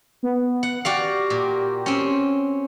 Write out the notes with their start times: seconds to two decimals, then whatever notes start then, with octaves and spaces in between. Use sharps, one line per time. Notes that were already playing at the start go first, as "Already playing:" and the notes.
0.23 B3
0.63 F#5
0.85 F#4 G4 D5 F5
1.30 A#2
1.86 C4 C#4